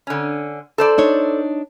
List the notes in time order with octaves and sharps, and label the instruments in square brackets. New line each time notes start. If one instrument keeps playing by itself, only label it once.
[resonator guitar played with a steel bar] D3 C#4
A4 C5 D5
[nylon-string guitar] D4 D#4 C#5